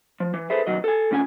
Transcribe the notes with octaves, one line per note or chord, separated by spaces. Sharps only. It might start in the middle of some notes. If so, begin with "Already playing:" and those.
F3
E3
G#4 A4 B4 C5 E5
E2 B2 D#3 F#3 D#5
A4 G#5
A2 D3 C#4 F4 G5 G#5